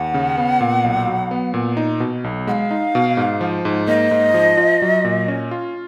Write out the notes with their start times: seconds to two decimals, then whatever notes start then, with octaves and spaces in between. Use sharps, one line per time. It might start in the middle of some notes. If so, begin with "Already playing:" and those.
Already playing: D#2 F#5
0.14 C#3
0.37 B3
0.61 A#2
0.84 B1
1.07 F#3
1.31 B3
1.54 A#2
1.77 D#4
2.00 B2
2.24 B1
2.47 G#3 F#5
2.51 F5
2.71 D#4
2.95 B2
3.17 G#2
3.41 F3
3.65 G#2
3.88 A#3 D#5
4.11 G#2
4.34 F3
4.57 F4
4.82 F#3
5.04 A#2
5.28 C#4
5.51 F4